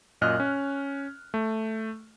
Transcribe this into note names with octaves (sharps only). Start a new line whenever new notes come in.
F#2 A#2 D#5 F6 F#6
C#4
A3